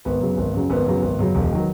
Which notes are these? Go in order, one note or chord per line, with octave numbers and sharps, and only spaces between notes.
G#1 B3
F#2 C#3 F#3
G#1
F#2 C#3 F#3
G#1 B3
F#2 C#3 F#3
G#1
F#2 C#3 F#3
E1
D#3 F#3